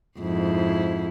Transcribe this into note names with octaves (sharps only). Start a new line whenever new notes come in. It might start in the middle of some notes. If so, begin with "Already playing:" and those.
F2 G#2 E4